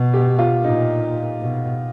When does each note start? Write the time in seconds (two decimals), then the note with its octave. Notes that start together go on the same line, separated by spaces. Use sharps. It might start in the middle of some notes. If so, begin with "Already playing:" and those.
Already playing: B2
0.14 G4
0.39 F4
0.64 A#2 D#4
1.41 B2